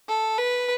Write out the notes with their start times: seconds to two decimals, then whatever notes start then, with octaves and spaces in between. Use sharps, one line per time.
0.09 A4
0.38 B4